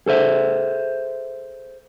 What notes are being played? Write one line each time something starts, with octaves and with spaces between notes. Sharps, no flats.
G#4 A4 C5 E5